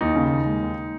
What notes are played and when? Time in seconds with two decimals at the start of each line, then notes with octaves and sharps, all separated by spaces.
0.01 D#2 D#4
0.16 C#3
0.31 D#2
0.46 G#3
0.63 D#2